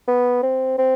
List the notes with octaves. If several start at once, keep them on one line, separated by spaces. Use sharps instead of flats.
B3
C4
C4